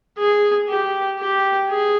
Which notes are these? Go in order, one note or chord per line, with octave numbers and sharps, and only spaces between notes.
G#4
G4
G4
G#4